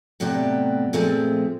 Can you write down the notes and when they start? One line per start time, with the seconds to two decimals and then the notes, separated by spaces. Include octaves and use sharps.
0.20 A2 C3 F#3 B3 D5 G5
0.93 A#2 F3 G#3 A3 C4